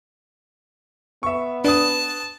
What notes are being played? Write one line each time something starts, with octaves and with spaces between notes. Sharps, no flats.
B3 E5 C#6
D4 B4 A5 D#6